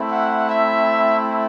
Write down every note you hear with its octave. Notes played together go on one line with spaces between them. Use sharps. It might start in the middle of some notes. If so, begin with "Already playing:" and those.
Already playing: A3 C4 E4
F#5
E5